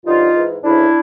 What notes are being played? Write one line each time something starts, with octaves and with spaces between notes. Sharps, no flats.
G2 D3 F3 D#4 F4
G#2 E3
D2 C#3 E3 D4 E4